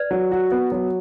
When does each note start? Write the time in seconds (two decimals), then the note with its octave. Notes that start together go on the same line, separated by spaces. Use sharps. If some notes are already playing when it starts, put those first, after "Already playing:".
Already playing: B4 D5
0.11 F#3
0.31 F#4
0.52 B3
0.72 F#3